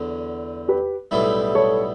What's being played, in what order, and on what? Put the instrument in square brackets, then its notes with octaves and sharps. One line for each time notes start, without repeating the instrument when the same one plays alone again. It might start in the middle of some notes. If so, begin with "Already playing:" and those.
Already playing: [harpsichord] E2 D3 F#3
[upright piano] G4 B4
[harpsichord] B1 A2 G3 B3 E4
[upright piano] A4 C#5